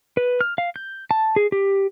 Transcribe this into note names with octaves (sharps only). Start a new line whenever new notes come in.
B4
F6
F5
G6
A5
G#4
G4